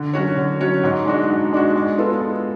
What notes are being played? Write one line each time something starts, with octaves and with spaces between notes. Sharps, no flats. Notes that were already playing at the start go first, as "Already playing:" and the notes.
Already playing: D3
F#3 C#4 F#4 C#5
D3
F#3 C#4 F#4 C#5
G#2
G#3 D4 F#4
G#2
G#3 D4 F#4
G#3
B3 F4 A4
G#3